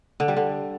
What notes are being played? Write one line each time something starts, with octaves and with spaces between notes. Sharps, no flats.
D3
G3
D3